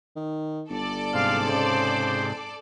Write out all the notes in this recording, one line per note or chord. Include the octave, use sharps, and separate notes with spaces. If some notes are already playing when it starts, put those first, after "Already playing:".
D#3
G1 A4 D5 D6
G#2 C3 F5
C#3 C5